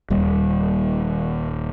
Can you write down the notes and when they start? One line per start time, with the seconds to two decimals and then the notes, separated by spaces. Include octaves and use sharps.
0.10 D#1 D#2 G3